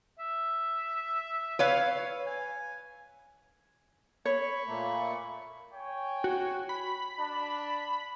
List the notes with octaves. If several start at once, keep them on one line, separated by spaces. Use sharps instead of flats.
E5
B4 C#5 F5
G#5
C#5 B5 C#6
A#2 A3 A#3
C#5 G5 G#5
F#4
B5
D4